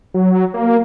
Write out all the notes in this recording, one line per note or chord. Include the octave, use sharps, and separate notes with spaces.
F#3
A#3